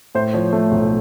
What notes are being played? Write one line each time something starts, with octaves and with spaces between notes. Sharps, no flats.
A2 C5
F3 C#5
A3
B1